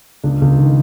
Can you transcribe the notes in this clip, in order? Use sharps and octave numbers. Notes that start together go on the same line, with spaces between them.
C#2 D4
C#2
D#3